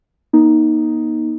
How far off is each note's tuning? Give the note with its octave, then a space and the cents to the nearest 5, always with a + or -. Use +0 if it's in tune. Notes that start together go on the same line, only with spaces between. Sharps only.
A#3 +45 D#4 +5